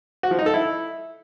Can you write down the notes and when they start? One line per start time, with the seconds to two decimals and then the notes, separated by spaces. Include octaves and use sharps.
0.23 F#4
0.31 F3
0.39 D#4
0.46 A4
0.54 E4